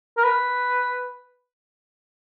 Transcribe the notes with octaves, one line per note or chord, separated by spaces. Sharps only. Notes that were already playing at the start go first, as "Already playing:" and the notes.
A#4
B4